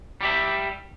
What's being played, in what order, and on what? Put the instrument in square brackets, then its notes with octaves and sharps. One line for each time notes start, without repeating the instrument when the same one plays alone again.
[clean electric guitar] G3 G4 E5